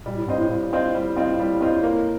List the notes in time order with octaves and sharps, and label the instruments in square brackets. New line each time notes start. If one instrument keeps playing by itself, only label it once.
[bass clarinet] A#2 [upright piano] G3
[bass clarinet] A2
[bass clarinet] G2 [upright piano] C4 F4 C5 D#5
[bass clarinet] A2
[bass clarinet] A2 [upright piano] G3
[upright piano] C4 F4 C5 D#5
G3
C4 F4 C5 D#5
G3
C4 F4 C5 D#5
A#3